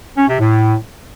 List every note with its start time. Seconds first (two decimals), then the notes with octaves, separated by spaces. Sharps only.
0.17 C#4
0.28 C3
0.39 A2